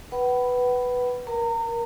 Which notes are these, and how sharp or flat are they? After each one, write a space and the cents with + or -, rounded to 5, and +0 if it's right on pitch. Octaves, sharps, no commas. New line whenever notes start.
B4 +0 F#5 +35 B5 +5
A#4 +15 A#5 -30